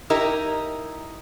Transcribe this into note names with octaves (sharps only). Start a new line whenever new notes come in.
D#4 E4 G4 A#4 D#5